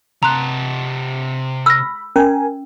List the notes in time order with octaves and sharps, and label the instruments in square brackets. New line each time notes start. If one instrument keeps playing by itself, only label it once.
[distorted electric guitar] C3 A5 [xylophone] A#5 C6 F#6
[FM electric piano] B5 [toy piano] E6 [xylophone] F6 A#6
[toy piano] C#4 [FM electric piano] A#4 G#5